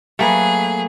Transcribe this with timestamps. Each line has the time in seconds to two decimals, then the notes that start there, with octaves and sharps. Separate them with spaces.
0.19 F#3 A3 A#3 G#4 B4